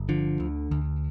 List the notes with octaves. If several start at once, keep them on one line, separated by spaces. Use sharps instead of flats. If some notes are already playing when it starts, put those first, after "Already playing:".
Already playing: G1
D3 F3
D2
D2